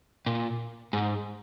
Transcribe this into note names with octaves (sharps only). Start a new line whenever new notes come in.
A#2
G#2